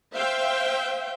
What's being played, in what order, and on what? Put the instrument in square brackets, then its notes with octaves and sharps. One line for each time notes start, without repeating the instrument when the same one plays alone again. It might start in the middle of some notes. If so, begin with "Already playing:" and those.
[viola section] C5 E5 F5 G5